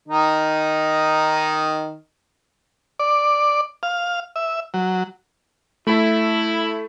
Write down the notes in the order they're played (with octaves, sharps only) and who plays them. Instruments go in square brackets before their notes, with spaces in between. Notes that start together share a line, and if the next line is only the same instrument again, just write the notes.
[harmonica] D#3 D#4
[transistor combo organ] D5
F5
E5
F#3
[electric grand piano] A3 A4 [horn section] E4